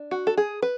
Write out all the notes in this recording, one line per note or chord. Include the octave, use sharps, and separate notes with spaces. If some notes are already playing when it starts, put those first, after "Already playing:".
Already playing: D4
F#4
A4
G#4
B4